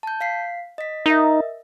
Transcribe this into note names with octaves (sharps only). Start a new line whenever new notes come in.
A5 G6
F5 B6 C7
D#5 B6
D#4 A#4 D#5 E5